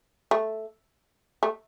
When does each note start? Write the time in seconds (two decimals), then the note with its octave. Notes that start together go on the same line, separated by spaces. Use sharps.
0.31 A3
1.43 A3